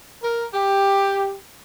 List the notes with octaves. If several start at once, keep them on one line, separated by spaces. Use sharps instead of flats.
A#4
G4